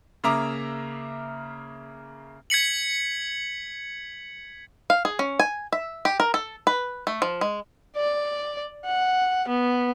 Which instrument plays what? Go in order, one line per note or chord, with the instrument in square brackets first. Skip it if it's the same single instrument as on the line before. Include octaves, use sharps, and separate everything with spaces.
[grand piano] C#3 A#3 E5 A#5 D6
[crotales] G#6 B6 C#7 F#7
[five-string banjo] F5
G#4
C#4
G#5
E5
G4
A#4
A4
B4
A3
F3
G#3
[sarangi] D5
F#5
B3